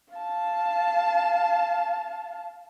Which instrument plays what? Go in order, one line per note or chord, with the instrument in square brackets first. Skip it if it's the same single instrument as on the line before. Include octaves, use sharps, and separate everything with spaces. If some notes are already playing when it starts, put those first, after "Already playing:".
[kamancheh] F5 A5